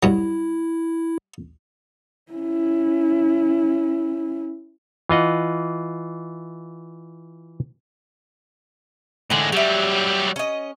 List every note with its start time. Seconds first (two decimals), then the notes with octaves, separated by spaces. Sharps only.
0.03 G2 F#3 E4
2.32 C#4 E4
5.09 E3 F4 D#5 F#5
9.30 A2 D3 E3 G#3
9.52 F#3 G3 G4 E5
10.36 C#4 D#5